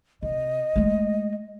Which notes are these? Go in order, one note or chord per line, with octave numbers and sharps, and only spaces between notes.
C3 D#5
G#3 A3